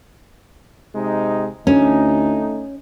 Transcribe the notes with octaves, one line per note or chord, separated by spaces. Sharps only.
C3 G#3 D#4
D2 A3 C#4 D#4